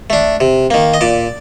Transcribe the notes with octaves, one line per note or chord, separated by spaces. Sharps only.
A3 D4
C3
D#3 A#3
D#5
A#2 D5